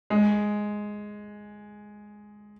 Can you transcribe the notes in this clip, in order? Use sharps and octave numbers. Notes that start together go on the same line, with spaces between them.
G#3